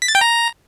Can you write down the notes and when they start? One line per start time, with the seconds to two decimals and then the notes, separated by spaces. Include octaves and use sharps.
0.02 B6
0.08 A6
0.15 G5
0.21 A#5